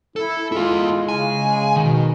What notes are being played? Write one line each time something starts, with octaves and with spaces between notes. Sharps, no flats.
E4 A4
G#3 E4 F4 G#4
C#3 G#5
B2 D#3